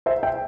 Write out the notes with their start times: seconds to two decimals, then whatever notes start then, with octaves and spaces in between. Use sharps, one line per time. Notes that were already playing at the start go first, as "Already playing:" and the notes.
0.06 C5 E5
0.23 E5 G5